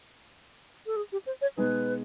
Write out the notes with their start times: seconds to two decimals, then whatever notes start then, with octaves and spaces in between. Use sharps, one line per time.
0.86 A4
0.96 G#4
1.12 G4
1.26 C5
1.41 C#5
1.57 B2 G#3 B3 D#4 G#4 B4